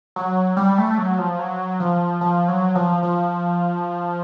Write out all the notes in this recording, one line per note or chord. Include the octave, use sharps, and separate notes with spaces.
F#3
G3
A3
F#3
F3
F#3
F3
F3
F#3
F3
F3